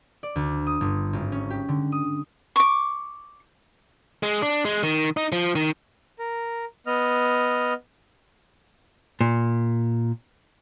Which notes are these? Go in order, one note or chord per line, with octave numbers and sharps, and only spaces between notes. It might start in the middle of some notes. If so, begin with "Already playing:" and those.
D5
D2
D#6
G1
G#1
C#4
G4
D3
D#6
C#6 D6
G#3
D4
G#3
D#3
D#4
F3
D#3
A#4
B3 D#5 F6
A#2